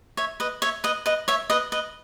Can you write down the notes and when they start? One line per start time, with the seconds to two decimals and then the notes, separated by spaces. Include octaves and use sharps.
0.17 C#5 E5
0.40 B4 D#5
0.62 C#5 E5
0.84 B4 D#5
1.06 B4 D#5
1.28 C#5 E5
1.50 B4 D#5
1.72 B4 D#5